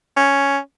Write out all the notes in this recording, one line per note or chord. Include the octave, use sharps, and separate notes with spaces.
C#4